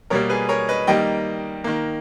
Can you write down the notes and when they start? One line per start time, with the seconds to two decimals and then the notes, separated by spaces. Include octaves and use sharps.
0.10 B2 G3 A#3 A#4 C#5
0.30 G#4 B4
0.49 A#4 C#5
0.68 B4 D#5
0.87 D#3 G3 A#3 D#5 G5
1.64 D#3 A#3